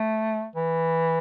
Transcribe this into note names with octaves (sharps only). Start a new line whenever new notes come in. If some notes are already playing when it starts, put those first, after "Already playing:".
Already playing: A3
E3